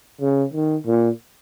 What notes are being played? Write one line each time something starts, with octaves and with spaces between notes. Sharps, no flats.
C#3
D#3
A#2